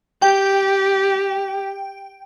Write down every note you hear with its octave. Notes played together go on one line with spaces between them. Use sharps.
G4 G5